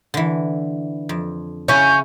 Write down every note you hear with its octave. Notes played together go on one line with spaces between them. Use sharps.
D3 E3
F2
C#3 C#4 E4 G6